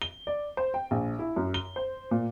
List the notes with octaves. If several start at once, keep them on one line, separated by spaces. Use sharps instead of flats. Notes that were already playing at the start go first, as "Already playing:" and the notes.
G7
D5
C5
G5
A#1
E4
F#2
G7
C5
A#2